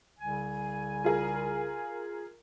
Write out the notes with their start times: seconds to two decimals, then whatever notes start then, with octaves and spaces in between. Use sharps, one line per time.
0.19 C2 C#3 G#5
1.04 F4 G#4 A#4